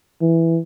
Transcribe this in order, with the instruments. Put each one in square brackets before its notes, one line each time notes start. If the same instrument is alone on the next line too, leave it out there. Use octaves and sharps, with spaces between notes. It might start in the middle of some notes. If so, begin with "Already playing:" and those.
[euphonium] E3